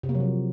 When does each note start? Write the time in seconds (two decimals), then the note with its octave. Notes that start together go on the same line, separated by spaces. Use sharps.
0.03 C3
0.09 A#3
0.15 F#3
0.20 F3